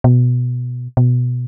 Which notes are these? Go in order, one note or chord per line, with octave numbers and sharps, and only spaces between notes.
B2
B2